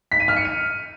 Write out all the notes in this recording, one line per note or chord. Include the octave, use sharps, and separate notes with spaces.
B6
D#7
F6
C#7
D#7